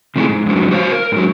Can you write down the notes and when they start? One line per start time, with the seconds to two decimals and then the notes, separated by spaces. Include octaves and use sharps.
0.16 C3 F3 A3 B3 E4 G#4
0.29 G#2
0.46 F2 G#2 F#3 D4
0.71 F#4 C5 C#5 F5
0.91 A#4
1.12 G#2 F#3